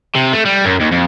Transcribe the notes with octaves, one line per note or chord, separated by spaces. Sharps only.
C3
A3
G3
F#2
D#2
F2